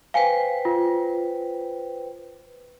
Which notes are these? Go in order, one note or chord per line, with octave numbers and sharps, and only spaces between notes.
B4 C5 F5 G5 G#5
F4